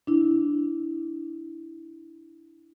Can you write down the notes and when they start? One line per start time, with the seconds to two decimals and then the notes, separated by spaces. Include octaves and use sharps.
0.07 D4 E4